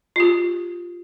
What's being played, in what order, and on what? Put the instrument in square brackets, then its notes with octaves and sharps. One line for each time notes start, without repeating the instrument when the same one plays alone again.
[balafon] F4 G4